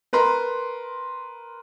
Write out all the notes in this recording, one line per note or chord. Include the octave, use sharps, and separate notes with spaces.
A#4 B4 A#5 C6